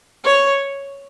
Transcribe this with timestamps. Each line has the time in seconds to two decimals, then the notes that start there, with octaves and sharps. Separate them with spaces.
0.24 C#5